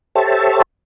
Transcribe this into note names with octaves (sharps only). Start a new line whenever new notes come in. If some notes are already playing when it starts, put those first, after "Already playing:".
G4 A4 C5 C#5 E5 A5